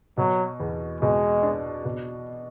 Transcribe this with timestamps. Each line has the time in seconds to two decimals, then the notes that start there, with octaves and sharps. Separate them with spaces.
0.17 B2 F#3
0.60 E2
1.01 B2 G#3
1.43 D4
1.85 B2